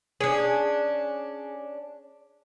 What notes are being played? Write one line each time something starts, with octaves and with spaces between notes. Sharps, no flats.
C#4 D4 G#4